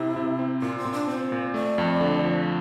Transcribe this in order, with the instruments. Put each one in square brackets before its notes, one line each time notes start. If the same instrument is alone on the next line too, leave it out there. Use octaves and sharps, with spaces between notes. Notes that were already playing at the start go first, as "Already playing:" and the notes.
Already playing: [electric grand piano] C3 C4 [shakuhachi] E4
[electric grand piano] C3
C4
[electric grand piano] A#2 [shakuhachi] F4
[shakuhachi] C4
[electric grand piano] A#2
[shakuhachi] D4
[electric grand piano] C4 [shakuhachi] C5
[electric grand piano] A#2
[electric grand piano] A3 [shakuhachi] D5
[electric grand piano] F2
D3
F3